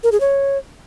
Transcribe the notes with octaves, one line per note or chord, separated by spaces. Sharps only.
A#4
G#4
C#5